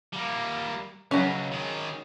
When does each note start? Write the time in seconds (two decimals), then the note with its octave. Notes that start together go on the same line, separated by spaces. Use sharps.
0.13 G3 A#3
1.11 C#2 F#3 C#4
1.52 D#3 G#4